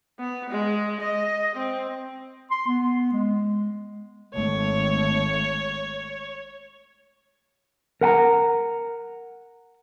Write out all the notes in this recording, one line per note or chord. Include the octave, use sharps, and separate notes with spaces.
B3
G#3
D#5
C4
C6
B3
G#3
G#1 A3 C#5
A#4 F#5 G#5 A#5